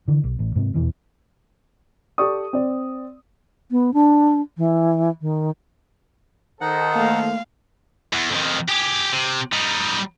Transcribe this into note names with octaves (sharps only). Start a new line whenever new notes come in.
D3 E3
B1
A1
G#2 C3
D#1 E2 B2 E3
G4 A4 D5 C#6 D#6
C4 D5
B3
D4
E3
D#3
D#3 D#4 A4 C5 F#5
A3 A#3 F5
E2
F2 D#3
G4 G#4
C3
G3 D#4